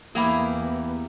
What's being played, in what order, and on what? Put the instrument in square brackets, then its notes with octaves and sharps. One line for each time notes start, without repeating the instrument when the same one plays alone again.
[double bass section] E2 E3 B3 [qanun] A#3 A#5 [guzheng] E4 G4 G#4